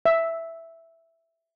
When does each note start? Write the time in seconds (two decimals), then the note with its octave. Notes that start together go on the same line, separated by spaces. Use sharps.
0.05 E5